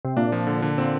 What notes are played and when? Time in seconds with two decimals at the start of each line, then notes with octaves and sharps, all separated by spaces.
0.05 C3
0.17 A#2 D4
0.32 F3
0.47 D3
0.62 D3
0.78 A#2 C4